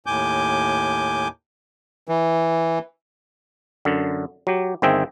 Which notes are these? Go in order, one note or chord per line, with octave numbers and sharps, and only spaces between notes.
D#2 A2 G#5 D6 G6
E3
F#2 D3
F#3 G4
G1 D#3 C4 G#4 E5 G5